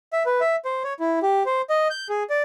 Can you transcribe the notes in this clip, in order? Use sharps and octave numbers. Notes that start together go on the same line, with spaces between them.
E5
B4
E5
C5
C#5
E4
G4
C5
D#5
G6
G#4
D5